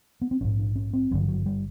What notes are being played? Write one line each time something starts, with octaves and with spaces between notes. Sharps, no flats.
B3
C4
A#1 G#2 C#4
D4
C#4
C4
G#1 G2 D3 F#3
F3
F#3
G3